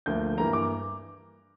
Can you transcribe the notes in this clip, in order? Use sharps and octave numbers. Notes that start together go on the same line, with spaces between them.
D2 D3 F3 A#3 G6
G2 E3 A#3 A#5
D6